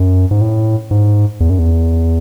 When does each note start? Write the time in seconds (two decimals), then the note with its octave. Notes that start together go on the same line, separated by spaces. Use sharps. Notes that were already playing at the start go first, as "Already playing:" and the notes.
Already playing: F#2
0.31 G#2
0.41 A2
0.91 G#2
1.40 E2
1.50 F#2
1.59 E2